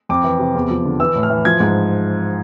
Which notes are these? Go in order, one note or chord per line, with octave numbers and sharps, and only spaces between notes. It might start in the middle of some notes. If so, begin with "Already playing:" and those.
F2 D6
E3
C3
E2
F3
D3
E3 E6
A2
F6
E3
F3 G#6
G#2